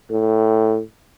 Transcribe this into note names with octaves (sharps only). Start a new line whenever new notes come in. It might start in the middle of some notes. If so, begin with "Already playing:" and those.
A2